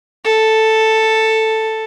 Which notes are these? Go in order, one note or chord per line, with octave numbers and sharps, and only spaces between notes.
A4